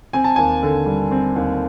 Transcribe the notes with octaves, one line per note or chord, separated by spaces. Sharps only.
C4 G#5
A5
D#2 G#5
D3
G3
C4
D#2